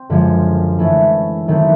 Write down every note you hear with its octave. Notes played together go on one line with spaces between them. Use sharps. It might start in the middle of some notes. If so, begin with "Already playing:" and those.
Already playing: C4
F#2 D3 F3 G#3
E3 A3 C#4 E4
D#3 F#3 A3 C4 E4